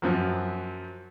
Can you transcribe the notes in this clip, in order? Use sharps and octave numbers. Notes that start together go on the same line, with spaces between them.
F#2 F3 F#3